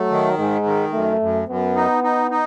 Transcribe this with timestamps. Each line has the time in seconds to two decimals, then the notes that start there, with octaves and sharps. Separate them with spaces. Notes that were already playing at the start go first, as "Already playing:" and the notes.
Already playing: F#3 A3
0.11 D#3
0.38 G#2 G#3
0.66 D#3
0.93 F#2 A3
1.21 F#2
1.48 F#2 B3
1.76 D#4
2.04 D#4
2.31 D#4